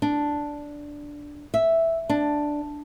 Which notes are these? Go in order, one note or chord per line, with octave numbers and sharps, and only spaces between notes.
D4
E5
D4